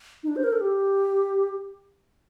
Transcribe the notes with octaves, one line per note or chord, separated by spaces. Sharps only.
D#4
D4
C5
A#4
A4
G4